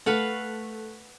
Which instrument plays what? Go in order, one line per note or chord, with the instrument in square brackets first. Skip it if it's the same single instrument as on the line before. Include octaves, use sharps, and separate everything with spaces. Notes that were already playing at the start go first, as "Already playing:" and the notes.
[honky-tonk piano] A3 [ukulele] A4 [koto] B4 F5 F#5